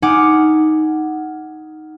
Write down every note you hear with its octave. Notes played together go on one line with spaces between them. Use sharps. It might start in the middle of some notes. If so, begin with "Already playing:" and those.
D#4 F#5 G#5 D6 F6